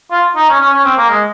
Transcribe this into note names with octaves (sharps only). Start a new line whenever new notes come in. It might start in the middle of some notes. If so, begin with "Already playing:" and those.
F4
D#4
C#4
C#4
C#4
C4
A#3
G#3